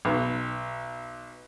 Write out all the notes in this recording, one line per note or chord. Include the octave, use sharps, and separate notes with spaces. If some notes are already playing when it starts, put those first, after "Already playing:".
B1